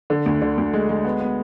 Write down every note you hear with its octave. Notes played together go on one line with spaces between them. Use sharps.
D3
D2
D3
D2
G#3
G#3
B3
B3